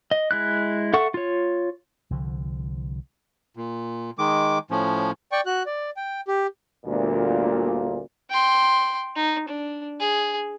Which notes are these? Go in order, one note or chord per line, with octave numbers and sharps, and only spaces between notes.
D#5
G#3 E4 F#6
A4 E5 F#5 C#6
F4 C#5
C2 D3 F3
A#2
D#3 G#3 D6
A2 F3 C#4
D5 G5 C#6
F#4 F#6
D5
G5
G4
G1 D2 A#2
G5 C6
D#4
D4
G#4